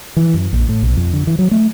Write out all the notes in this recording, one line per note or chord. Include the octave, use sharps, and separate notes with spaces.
E3
F#2
A#1
A2
B1
F2
D3
E3
F#3
A3